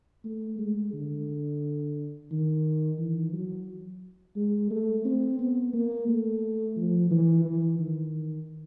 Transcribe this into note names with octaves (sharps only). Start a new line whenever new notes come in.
A3
G#3
D3
D#3
E3
F#3
G#3
A3
C4
B3
A#3
A3
F3
E3
E3
D#3